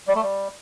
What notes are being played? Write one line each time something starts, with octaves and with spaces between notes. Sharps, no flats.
G3
A3
G3